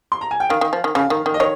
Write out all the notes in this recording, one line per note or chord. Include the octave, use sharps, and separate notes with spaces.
C6
A#5
G#5
G5
D#3 F5
D#3
F3
D#3
C#3 F5
D#3
D#3
D#5
D#3 C#5